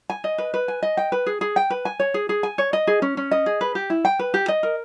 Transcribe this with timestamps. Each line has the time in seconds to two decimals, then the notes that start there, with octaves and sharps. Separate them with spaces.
0.10 G#5
0.24 D#5
0.38 B4
0.54 B4
0.68 G#5
0.83 D#5
0.97 G5
1.12 B4
1.26 G#4
1.41 G#4
1.56 G5
1.70 B4
1.85 G#5
2.00 C#5
2.14 G#4
2.29 G#4
2.43 G#5
2.58 C#5
2.73 D#5
2.87 G#4
3.02 C#4
3.17 C#4
3.31 D#5
3.46 G#4
3.61 B4
3.75 G4
3.90 E4
4.05 G5
4.19 B4
4.34 G4
4.48 D#5
4.63 A#4